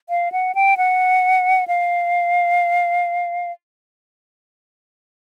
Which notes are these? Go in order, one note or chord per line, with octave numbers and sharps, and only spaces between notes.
F5
F#5
G5
F#5
F5